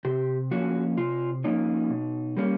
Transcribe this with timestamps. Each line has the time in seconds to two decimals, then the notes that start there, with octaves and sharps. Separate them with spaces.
0.05 C3 G4
0.51 F3 A#3 C#4 F#4
0.97 C3 F4
1.44 F3 A#3 C#4 D#4
1.90 B2
2.37 G3 A#3 C#4